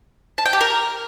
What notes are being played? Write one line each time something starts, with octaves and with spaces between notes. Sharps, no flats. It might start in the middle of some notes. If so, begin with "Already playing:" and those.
A5
G5
G4
A#4